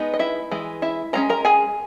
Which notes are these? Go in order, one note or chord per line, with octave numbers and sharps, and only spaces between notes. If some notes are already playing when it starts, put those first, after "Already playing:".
Already playing: G#3 B3 D#4
D#5
E4 E5
E3 G#3
E4 E5
D#3 G#3 C#4 A#5
A#4 A#5
G#4 G#5